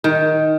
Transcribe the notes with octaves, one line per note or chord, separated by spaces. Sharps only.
D#3